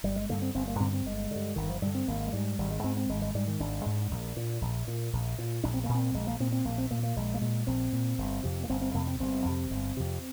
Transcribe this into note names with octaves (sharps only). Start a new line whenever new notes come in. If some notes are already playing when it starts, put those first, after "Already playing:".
G1 G3
G#3
G2 D3 A#3
C4
G1 C4
A#3
G2 D3 C4
C4
G1 G#3
G2 D3
G1 D#3
F3
G2 D3 G3
C4
G#1 A#3
G#3
G#2 G3
G#1 G3
G#3
G#2 C4
C4
G#1 G#3
G#3
G#2 G3
D#3
G#1 D4
G#2
A#1
A#2
A#1
A#2
A#1
A#2
A#1 D4
C4
A#3
A#2
C4
A#1 G#3
A#3
A#2 C4
C4
A#1 A#3
C4
A#2 A#3
A#3
A#1 G#3
A#3
A#2 G#3
A#1 C4
A#2
G1
F2 C3
A#3
G1 C4
C4
F2 C3 A#3
C4
G1 C4
F2 C3
G1
F2 C3